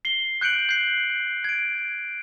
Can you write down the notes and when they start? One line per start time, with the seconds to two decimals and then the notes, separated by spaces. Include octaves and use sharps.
0.05 C7 G7
0.41 F#6 G6 C#7 D7 F#7
0.69 G6 C7
1.44 G#6 D7